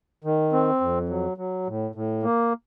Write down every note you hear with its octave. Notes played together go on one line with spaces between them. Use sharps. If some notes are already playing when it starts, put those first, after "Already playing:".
D#3
C4
F2
F#3
F#3
A2
A2
A#3